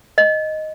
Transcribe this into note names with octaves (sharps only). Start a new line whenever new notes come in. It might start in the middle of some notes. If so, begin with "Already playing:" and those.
D#5